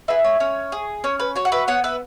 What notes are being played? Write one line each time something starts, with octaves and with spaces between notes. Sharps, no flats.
E4 G#4 B4 E5
C#5
C#4 C#5
G#4
C#4 C#5
B4
F#4 C#5
F#5
B4 E5
B3 C#5 F#5
B4 E5